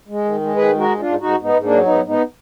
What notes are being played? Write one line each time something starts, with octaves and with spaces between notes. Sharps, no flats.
G#3
D#3
G#3
D#3 G#4 B4
G#3
F#4 A#4
G#2
G#2 D4 F4
G#2 D#4 F#4
G#2 B3 D#4
G#2
A#3 D4
F#3
G#2 B3 D#4
G#2 B3 D#4